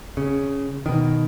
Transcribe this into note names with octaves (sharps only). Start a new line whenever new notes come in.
C#3
B2 D#3